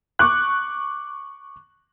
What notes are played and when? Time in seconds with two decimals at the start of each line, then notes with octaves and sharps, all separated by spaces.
0.19 C#6 D6 F#6